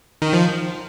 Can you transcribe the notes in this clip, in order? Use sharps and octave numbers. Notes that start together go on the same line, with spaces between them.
D#3
F3